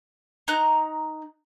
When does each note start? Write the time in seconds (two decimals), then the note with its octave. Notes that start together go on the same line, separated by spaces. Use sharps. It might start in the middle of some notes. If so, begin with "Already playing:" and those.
0.48 D#4 A#5 F#6